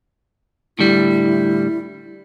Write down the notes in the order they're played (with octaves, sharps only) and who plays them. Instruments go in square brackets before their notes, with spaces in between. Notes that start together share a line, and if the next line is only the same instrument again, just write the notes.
[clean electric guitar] A2 D3 G3 [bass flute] E4